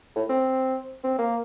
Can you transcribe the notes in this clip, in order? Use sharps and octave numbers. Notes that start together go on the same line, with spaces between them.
A2
C4
C4
A#3